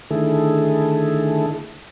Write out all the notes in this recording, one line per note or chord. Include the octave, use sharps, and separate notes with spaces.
D3 D#3 A3 E4 G#4 A4